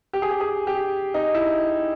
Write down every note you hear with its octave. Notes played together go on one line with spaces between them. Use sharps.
G4
G#4
G4
G#4
G4
D#4
E4